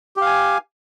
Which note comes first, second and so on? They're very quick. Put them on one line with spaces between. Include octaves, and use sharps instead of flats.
G4 F5 G#5